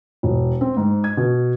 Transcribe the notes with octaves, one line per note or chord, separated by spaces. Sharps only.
E1
C4
G#2
G#6
B2